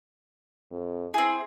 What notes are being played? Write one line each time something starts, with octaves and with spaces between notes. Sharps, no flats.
F2
C4 E4 G#4